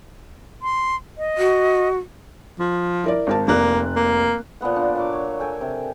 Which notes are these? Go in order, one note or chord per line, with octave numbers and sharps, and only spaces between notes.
C6
D#5
F#4
F3
E4 A#4 D5
G#1 A#4 A5
F1 A#3 D5 F#6
A#3
A#2 F3 B3 F#5
F3 D4
A#2 F#3 D6
C#5
A4 G5 G#5
C3